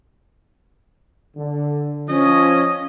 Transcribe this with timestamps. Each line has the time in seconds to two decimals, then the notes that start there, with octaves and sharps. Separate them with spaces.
1.36 D3
2.09 F3 C#4 D#5